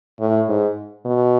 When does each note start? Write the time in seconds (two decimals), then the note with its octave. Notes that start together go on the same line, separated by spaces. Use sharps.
0.20 A2
0.49 G#2
1.06 B2